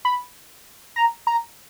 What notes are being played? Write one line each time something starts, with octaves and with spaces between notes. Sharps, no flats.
B5
A#5
A#5